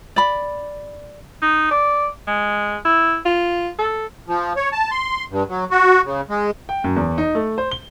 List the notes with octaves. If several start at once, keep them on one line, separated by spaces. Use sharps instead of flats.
D5 B5
D#4
D5
G#3
E4
F4
A4
F3
C#5
A5
C6
G2
F#3
F#4
C#3
G#3
G5
F#2
E2
D#4
A3
C5
G7